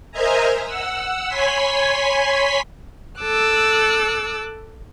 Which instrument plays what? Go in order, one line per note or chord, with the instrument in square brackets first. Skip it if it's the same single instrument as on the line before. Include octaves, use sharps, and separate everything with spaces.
[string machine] A#4 C5 D#5 E5 G#5 A#5
F#5 E6
C#5 G#5 B5 C6 B6
[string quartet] A4 D6 E6 F#6